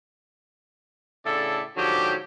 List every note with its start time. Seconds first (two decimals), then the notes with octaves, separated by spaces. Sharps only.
1.26 A2 C#3 D4 A4 D5 E5
1.77 G#2 D3 F3 F#3 G4